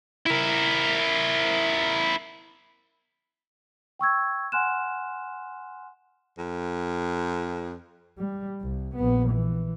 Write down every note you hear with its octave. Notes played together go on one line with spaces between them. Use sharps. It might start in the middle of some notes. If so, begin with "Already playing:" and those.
E4 A#4
G5 C#6 E6 G#6
F#5 G#5 C6 F6 F#6 E7
F2
G3
C2
A#1 B3
E3